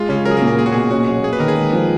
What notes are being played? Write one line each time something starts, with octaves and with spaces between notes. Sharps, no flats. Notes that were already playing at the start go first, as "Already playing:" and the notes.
Already playing: G#3 F4
C#3 C#4
F#3 A#4
G#4
A#4
A#2
A#4
A#3 G#4
F#4
B2 G#4
C#4 F#4
F#3
A#3 G#4
B4
D#3 A#4
G#4
G#3
F3